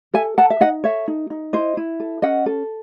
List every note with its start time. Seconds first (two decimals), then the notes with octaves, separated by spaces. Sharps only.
0.14 A4 E5 G#5
0.38 A4 F#5 A5
0.50 E5
0.60 D#4 D#5 F#5
0.84 A4 C#5 E5
1.08 D#4
1.30 D#4
1.53 E4 C5 D#5
1.77 E4
2.00 A4
2.22 C#4 D#5 F#5
2.46 A4